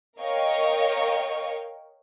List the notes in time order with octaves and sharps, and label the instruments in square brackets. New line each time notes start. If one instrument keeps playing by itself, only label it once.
[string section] A#4 C#5 D#5 F5 G5 C#6